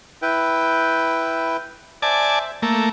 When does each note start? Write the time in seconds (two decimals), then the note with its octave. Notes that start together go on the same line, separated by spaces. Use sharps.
0.22 E4 B4 G5
2.02 C5 D5 E5 G#5 A5
2.62 A3 A#3 A4 E6